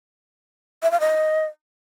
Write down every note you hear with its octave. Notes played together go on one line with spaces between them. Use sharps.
E5
F5
D#5